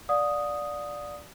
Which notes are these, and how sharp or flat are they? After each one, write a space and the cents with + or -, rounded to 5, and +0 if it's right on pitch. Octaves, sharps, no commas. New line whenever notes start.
D5 +0 F5 +45 D#6 +0